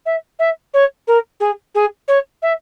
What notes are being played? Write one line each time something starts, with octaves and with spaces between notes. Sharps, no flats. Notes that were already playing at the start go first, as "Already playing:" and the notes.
E5
E5
C#5
A#4
G#4
G#4
C#5
E5